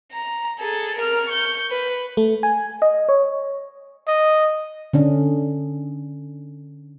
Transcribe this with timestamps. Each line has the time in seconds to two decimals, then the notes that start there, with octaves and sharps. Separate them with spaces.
0.13 A#5
0.60 G#4 A4
0.97 A#4 F6
1.29 C#6 G6
1.71 B4
2.17 A3
2.43 G#5
2.82 D#5
3.09 C#5
4.08 D#5
4.93 D3 C#4 D4